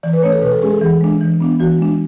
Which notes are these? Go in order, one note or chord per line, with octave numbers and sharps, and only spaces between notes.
E3 D5
B4
A3 C#4 C#5
A4
B2 B4
A4
G#3 C#4 G#4
A4
E3 G#4
G#3 D4
E3
B3 D4
E3 F#4
G#3 D4